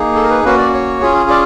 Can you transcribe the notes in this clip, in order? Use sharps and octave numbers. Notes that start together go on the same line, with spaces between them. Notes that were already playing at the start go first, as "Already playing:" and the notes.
Already playing: A#3 D#4 G#4
A4
A#4
B4
A#3 C#4 F#4 B4
D5
C#5
C#4 F4 G#4
D5